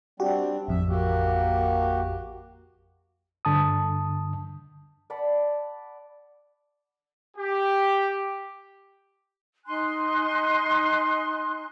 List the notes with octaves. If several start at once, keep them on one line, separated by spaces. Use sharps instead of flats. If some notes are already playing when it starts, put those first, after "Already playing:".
G3 C4 D4 F#4 G4
A1 F2 E5
A#3 F#4 G4
G2 D3 A5 D#6
D5 F#5 A5 B5
G4
D#4 G#5 C6 F#6